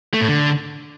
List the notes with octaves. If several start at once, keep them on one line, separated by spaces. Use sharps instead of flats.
A3
A2
D3